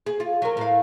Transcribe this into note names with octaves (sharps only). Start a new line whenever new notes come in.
G#4
F4
F#3 A#4
A2 F5